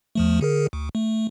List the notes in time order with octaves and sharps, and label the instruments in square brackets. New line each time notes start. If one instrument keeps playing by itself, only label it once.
[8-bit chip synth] E2 F3 A3
D3 G#4 A#4
D2
A3